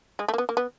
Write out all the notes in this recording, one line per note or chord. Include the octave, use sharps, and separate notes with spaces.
G#3
A3
A#3
B3
A#3
B3